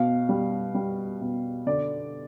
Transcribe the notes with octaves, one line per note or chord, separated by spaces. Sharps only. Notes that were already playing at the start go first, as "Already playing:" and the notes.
Already playing: B2 F5
G3
G3
B2
D3 D5